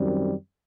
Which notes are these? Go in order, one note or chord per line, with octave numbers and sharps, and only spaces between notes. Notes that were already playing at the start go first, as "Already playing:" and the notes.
Already playing: F#2 D#3 G3 C4